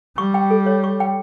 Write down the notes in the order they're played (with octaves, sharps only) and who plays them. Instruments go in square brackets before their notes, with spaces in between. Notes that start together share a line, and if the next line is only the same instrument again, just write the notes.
[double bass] G3 [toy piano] C#6
[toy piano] G5
A4
C#5
C#6
G5